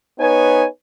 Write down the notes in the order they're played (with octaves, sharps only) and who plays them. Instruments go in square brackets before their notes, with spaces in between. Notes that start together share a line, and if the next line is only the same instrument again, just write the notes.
[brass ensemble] B3 D#4 B4 C#5 G#5